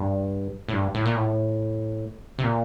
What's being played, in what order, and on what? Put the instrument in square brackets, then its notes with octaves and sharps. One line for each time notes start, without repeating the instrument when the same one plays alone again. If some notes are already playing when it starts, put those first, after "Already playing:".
Already playing: [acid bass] G2
A2
G2
A2
A#2
A2
C3
A#2